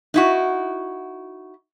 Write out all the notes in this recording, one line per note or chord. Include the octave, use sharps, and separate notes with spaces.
D#4 E4 F#4